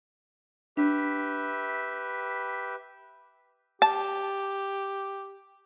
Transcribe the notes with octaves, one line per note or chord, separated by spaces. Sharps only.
D4 G4 B4 E5
G4 A5